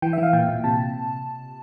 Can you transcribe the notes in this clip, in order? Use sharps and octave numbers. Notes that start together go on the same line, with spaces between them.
E3 G5
E5
E3
F5
A#2 G5
A#2
C3 A5